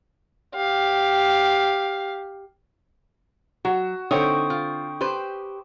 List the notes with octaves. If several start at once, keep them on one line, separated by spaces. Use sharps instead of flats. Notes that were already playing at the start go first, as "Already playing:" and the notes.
G4 F5
F#3 F#4
D3 C4 D#4 C#5 E5 G5 C#6 D#6
F4
G4 B4 C5